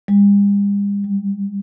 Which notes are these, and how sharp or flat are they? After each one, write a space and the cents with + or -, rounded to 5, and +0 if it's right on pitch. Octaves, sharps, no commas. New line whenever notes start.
G3 +45
G3 -15